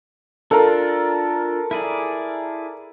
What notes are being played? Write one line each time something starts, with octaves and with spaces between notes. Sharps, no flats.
D4 F4 A4 A#4
E4 G#4 D5